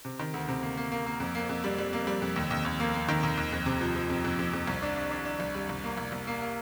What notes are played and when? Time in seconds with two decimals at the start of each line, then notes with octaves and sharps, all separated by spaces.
0.05 C3
0.19 D#3
0.34 D2
0.48 C3
0.63 A#3
0.77 A#3
0.92 A#3
1.06 A#3
1.20 F2
1.35 A#3
1.49 F2
1.64 G3
1.78 G3
1.93 A#3
2.07 G3
2.22 F2
2.36 D#2
2.51 D#2
2.65 D#2
2.80 A#3
2.94 A#3
3.08 D#3
3.23 D#2
3.37 D#2
3.52 F2
3.66 C3
3.81 F3
3.96 F3
4.10 F2
4.24 F2
4.39 F2
4.53 F2
4.67 C2
4.82 D4
4.96 D4
5.11 D4
5.25 D4
5.40 C2
5.54 G3
5.69 C2
5.84 A#3
5.97 C2
6.12 C2
6.27 A#3
6.41 A#3